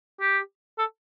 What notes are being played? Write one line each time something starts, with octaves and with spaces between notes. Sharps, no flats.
G4
A4